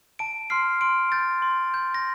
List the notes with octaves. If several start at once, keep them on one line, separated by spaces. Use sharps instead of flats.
A5 D7
C6 F6 C7
C6 D7
G6 A6
C6
G6
A#6